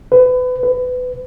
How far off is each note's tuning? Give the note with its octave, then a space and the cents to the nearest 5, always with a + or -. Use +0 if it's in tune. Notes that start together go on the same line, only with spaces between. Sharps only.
B4 +30
B4 +25